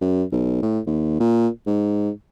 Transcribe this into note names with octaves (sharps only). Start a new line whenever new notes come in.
F#2
B1
A2
D#2
A#2
G#2